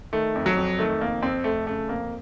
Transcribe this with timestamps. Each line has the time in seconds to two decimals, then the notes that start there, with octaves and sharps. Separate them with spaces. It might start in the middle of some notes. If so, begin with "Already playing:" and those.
0.13 D#3 A3
0.35 F2
0.46 F#3
0.57 F2
0.79 D#3 A3
1.01 F2 A#3
1.22 F2 C4
1.44 F2 A3
1.67 C#3 A3
1.88 F2 A#3